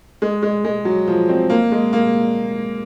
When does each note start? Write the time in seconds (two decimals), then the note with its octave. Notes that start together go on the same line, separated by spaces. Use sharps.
0.22 G#3
0.42 G#3
0.65 G#3
0.85 F#3
1.08 F3
1.29 C4
1.50 A#3
1.72 G#3
1.93 A#3